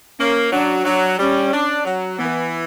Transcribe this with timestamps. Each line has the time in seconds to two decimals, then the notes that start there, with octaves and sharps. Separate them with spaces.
0.19 A#3 C#4
0.53 F#3 D4
0.85 F#3 D4
1.19 G3 C#4
1.53 D4
1.85 F#3
2.18 E3 B3